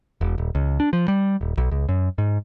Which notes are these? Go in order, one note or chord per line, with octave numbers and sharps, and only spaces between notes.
E1
D#1
C#2
D4
F3
G3
D#1
B1
C#2
F#2
G#2